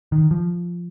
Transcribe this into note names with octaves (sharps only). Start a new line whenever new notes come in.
D#3
F3